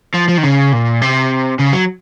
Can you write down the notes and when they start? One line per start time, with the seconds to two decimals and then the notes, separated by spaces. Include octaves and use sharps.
0.14 F3
0.29 F3
0.38 D#3
0.44 C#3
0.73 A#2
1.02 C3
1.60 C#3
1.73 F#3